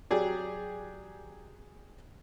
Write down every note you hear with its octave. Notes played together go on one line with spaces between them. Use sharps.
F#3 G4 G#4 D5